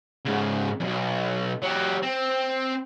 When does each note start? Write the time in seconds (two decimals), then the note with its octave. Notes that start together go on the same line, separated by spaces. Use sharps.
0.25 G#2 C#3
0.80 B1 F2
1.62 F#3 G4
2.03 C4